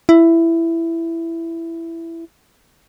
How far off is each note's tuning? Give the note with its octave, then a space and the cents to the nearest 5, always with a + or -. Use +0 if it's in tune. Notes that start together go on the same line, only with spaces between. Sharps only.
E4 +10